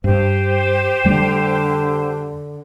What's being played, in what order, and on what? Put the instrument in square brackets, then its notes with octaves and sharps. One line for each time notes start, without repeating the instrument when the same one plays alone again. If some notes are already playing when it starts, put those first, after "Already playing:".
[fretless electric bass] G2 [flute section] G4 C5
[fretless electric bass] F2 G3 A3 [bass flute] D3